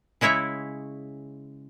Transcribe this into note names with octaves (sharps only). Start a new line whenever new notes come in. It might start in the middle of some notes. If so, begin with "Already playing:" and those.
C#3 G#3 E4 C#5 E5